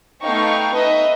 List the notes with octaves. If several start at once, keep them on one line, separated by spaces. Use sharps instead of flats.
A3 B3 D#4 F5 G5 C#6
D#4 B4 D#5 E5